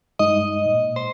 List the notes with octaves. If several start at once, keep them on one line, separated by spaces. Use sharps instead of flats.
G2 G#3 D#4 D#5
A#2
C5